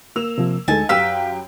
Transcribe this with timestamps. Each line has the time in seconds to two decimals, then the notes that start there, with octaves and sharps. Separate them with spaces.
0.16 A#3 E6 F7
0.38 C3 F3
0.68 D2 G#3 D#4 A4 G#5 A5
0.89 F#2 G4 B4 F5 G5 E6